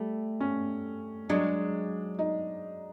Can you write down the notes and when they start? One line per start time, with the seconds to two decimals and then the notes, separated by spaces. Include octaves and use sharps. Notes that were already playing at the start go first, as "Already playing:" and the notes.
Already playing: G3 A3
0.40 C#4
1.29 F#3 G#3 D4
2.19 D#4